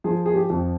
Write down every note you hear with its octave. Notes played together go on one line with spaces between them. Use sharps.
F3 G#4
G#4
G4
F2